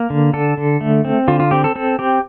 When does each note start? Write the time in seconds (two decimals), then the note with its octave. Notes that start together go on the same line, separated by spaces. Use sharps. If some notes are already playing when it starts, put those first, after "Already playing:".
Already playing: A#3
0.10 D3
0.33 D3 A4
0.57 D3
0.81 A3
1.05 C4
1.28 D3 F4
1.40 F4
1.51 C4 G4
1.64 A4
1.76 C4 A4
1.99 C4 G4